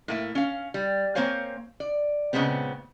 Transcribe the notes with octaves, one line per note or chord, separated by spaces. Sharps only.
A2 A#3 E5
C#4 F5
G3
A#3 C4 C5 C#5 F5 G#5
D5
A#2 C#3 E3 G#3 B3 C4